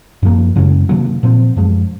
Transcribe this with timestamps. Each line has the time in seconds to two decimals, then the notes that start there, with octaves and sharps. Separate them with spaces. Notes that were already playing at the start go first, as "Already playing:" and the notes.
0.23 F#2 F3 A#3
0.56 F#2 C#3 G#3 C#4
0.89 C3 D#3 F#3 A#3
1.23 A#2 F3 C4
1.57 F#2 F3 G#3